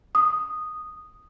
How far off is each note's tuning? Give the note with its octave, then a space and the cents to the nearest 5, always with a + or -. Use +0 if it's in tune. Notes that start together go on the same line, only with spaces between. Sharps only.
D#6 -5